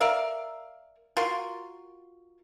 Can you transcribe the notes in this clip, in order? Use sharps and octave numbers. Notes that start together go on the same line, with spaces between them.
A#4 D5 E5 F5
F4 F#4 A#4 C6